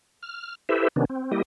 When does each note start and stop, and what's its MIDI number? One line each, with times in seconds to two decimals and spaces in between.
0.23 0.55 89
0.69 0.88 64
0.69 0.88 67
0.69 0.88 69
0.69 0.88 71
0.69 0.88 72
0.69 0.88 76
0.96 1.05 48
0.96 1.05 51
0.96 1.05 59
0.96 1.05 61
0.96 1.05 62
1.10 1.31 60
1.32 1.42 55
1.32 1.42 58
1.32 1.42 64
1.32 1.42 67
1.32 1.42 75